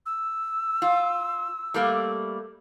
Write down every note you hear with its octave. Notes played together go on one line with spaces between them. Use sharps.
E6
F4
G3 A3 A#3